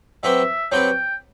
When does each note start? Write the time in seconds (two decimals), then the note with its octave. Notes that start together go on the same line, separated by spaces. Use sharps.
0.23 F#3 C4 G4 B4 E5
0.72 F#3 C4 G4 B4 G5